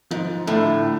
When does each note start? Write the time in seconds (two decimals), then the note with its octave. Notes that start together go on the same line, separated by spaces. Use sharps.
0.11 G#2 F3
0.47 A2 D3